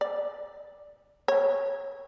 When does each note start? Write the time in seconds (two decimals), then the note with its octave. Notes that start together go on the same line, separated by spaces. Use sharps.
0.01 D5
1.28 C#5